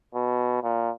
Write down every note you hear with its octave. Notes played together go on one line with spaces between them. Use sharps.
B2
A#2